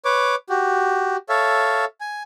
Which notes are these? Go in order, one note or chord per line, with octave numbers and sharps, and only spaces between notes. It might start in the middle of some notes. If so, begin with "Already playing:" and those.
B4 C#5 D6
F#4 G4
A4 C#5 E5 F5
G#5